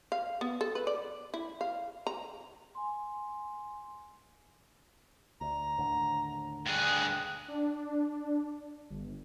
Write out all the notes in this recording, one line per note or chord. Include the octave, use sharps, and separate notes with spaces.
F5
B3
A4
B4
D5
E4
F5
A#5
G#5 C6
D2 A#5
D#2 A2 D3
G2 G#4 G5 F#6
D4
G1